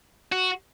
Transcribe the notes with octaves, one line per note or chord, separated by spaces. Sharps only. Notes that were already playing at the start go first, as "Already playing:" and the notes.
F#4